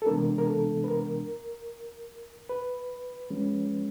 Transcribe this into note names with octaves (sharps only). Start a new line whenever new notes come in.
A4
C3 E3 G#3 B3 D4 A#4
A#4
A4
B4
A#4
B4
F3 G#3 C#4